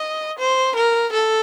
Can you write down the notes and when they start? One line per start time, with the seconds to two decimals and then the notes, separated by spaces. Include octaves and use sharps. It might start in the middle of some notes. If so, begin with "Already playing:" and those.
Already playing: D#5
0.38 C5
0.75 A#4
1.12 A4